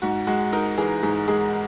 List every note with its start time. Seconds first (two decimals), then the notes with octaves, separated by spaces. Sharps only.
0.02 G#2 F#4
0.27 G#3 F#4
0.53 D#4 A#4
0.77 E3 G#4
1.03 G#2 G#4
1.28 G#3 G#4